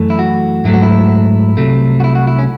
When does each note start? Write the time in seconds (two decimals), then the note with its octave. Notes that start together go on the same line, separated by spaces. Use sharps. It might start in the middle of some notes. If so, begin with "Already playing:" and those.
Already playing: F#2 E3 A3
0.10 E4
0.19 F#4
0.65 G#2 F#3 A3 E4
0.73 F#4
0.83 E4
1.57 C2 C3 F#3 A3
2.00 F#4
2.04 E4
2.15 F#4
2.27 E4
2.39 C#4